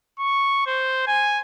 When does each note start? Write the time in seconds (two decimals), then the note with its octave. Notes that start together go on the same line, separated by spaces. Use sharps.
0.19 C#6
0.67 C5
1.07 G#5